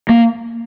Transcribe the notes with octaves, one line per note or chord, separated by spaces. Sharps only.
A#3